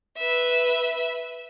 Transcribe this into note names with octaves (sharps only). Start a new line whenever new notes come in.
B4 E5